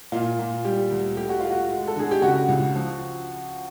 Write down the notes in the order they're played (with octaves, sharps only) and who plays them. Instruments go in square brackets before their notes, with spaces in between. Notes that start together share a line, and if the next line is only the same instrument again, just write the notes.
[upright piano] A#2 F4
A#2
G3 G4
D2
A3 G4
F#4
A3 F4
F#4
G#3
A4
D3 G#4
G4
C#3 F#4
C#2
F3